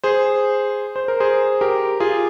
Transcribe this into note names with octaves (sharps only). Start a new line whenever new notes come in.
G#4 C5
C5
A#4
G#4 C5
G4 A#4
F4 G#4